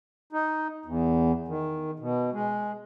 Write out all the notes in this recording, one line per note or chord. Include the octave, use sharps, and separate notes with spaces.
D#4
E2
D#3
B2
G#3